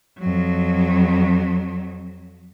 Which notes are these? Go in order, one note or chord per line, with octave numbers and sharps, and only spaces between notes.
F2 F#3